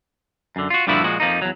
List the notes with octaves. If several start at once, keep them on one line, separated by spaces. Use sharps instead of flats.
F#2 D3
F4 F#4
G2 A#2 D3 F3 E4 F#4
A#2 F3 G#3 F#4
F2 F3 A#3 D#4
E2 F#3